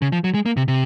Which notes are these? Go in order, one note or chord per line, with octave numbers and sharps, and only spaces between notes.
C#3
F3
F#3
G#3
A#3
C3
C3